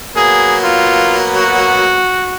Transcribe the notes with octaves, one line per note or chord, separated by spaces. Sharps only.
F#3 A#3 B3 G#4
F4
F#4